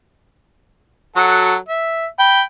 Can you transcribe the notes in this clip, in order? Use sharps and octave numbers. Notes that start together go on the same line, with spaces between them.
F#3 F#4 A4
E5
G5 B5